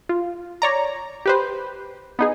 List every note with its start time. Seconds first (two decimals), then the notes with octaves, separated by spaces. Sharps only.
0.09 F4
0.62 C#5 D5 A#5
1.26 G4 B4 C5
2.19 B3 D#4 G#4